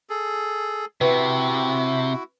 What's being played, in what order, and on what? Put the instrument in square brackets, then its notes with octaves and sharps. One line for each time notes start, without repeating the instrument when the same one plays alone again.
[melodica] G#4 A4
[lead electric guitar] C3 [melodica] E4 F#4 [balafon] B4